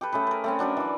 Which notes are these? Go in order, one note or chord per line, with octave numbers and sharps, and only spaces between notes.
G4 A4 B4
A3 C#4 G#4 B4
A#4 B4
A3 C4 C#4
F#3 D4 A#4 B4
E3 D5